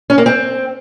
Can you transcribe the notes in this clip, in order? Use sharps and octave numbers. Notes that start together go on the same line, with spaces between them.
C#4
A#3
C4